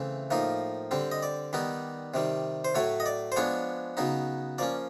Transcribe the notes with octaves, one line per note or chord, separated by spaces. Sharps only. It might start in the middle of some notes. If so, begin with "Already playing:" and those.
Already playing: C#3 E3 A3 C4
A2 F3 A#3 D#4
D3 G3 C4
D#5
D5
D#3 G3 B3 D#4
C3 D#3 G3
C5
A2 F#3 A3 C#5
D#5
D5
C5
F3 G#3 B3 D4 C#5
C#3 F#3 B3 D#4
F3 A#3 C#4 D5